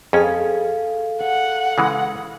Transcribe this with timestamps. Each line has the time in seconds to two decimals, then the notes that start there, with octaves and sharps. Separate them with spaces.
0.13 F2 C#4 G#4 A4 F5
1.22 F#5
1.78 C#3 E3 G#3